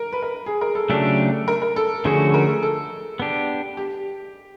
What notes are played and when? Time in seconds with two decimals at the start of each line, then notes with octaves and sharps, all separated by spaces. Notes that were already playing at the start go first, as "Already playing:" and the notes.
Already playing: A#4
0.12 B4
0.22 A#4
0.46 G#4
0.61 A#4
0.75 A4
0.90 C#3 F#3 A3 D4 G4 A4
1.48 A#4
1.62 A#4
1.76 A4
2.05 D3 F3 A3 C#4 F#4 G#4
2.34 A#4
2.48 A4
2.63 A4
3.20 B3 D4 G4
3.77 G4